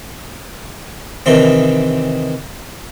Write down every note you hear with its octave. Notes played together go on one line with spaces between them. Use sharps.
C3 D#3 E3 C4